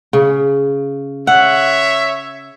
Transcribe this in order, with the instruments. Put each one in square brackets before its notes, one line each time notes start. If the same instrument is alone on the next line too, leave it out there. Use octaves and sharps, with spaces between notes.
[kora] C#3
[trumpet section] C#5 E5 [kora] F#5